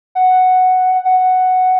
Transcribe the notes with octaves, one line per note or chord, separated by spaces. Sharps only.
F#5
F#5